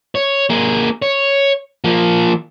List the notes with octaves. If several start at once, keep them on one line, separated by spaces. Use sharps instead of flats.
C#5
A#3 G#4
C#5
F3 A#3